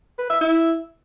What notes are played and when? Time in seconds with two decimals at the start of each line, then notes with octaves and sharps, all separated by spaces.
0.18 B4
0.29 E5
0.41 E4